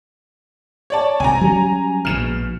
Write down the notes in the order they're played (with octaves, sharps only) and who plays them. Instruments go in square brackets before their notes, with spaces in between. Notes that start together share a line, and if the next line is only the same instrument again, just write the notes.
[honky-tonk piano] C#5 D5 A5
[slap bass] C2 G#2 [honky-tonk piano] G#5 A#5
[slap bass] F#3 G3 C#4
[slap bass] A#1 G#2 B2 [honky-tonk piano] F6 E7